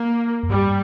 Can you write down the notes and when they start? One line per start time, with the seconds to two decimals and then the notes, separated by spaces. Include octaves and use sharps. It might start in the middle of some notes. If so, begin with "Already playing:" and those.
Already playing: A#3
0.43 F2
0.50 G2 G3